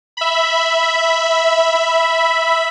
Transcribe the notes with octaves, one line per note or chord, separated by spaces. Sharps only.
E5 B5